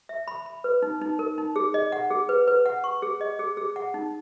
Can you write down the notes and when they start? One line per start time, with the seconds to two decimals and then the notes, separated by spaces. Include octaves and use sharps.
0.09 E5
0.28 B5
0.46 B5
0.64 B4
0.82 D#4
1.01 D#4
1.19 A#4
1.38 D#4
1.56 G#4
1.74 D#5
1.92 F#5
2.11 G#4
2.29 B4
2.48 B4
2.66 F#5
2.84 C#6
3.02 G#4
3.21 D#5
3.39 G#4
3.57 G#4
3.76 F#5
3.94 D#4